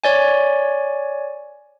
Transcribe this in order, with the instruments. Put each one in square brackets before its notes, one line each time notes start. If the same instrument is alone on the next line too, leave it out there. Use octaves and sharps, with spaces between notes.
[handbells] C#5 D5 G#5